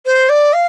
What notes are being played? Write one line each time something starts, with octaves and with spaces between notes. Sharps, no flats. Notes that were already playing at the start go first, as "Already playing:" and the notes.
C5
D5
F5